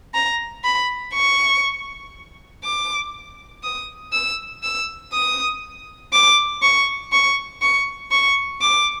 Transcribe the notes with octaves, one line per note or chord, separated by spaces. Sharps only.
A#5
B5
C#6
D6
D#6
E6
E6
D#6
D6
C#6
C#6
C#6
C#6
D6